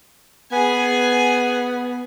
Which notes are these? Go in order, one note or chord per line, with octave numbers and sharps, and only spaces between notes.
B3 G#4 G#5